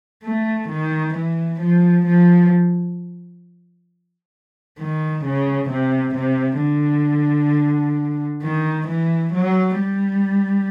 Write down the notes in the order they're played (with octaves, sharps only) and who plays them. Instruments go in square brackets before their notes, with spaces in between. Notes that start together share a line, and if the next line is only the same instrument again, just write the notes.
[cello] A3
D#3
E3
F3
F3
D#3
C#3
C3
C3
D3
D#3
E3
F#3
G3